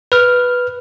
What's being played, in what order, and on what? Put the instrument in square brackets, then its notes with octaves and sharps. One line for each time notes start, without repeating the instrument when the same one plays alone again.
[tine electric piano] B4 F6